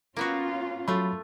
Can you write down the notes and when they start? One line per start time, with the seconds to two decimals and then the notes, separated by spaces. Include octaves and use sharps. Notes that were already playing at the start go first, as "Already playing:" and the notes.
0.16 A#3 B3 C#4 F4 F#4
0.88 F#3 A3 F4 B5